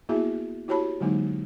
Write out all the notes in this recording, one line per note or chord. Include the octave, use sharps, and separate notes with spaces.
A#3 B3 E4 F#4 G#4 E5
E4 F#4 G4 C#5 A5 B5
D3 F#3 G#3 A#3 D#4